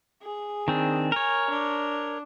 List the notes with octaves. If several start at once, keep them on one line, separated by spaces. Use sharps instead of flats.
G#4
D#3 C4 D4
A#4 C#5 G#5
D4